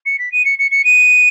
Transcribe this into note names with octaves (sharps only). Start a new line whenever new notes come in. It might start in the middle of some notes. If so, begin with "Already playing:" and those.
C#7
B6
D#7
C#7
C#7
C#7
D#7